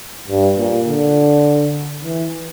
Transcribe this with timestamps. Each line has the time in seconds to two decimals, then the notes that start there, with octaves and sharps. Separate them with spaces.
0.28 G2
0.58 A#2
0.87 D3
2.04 E3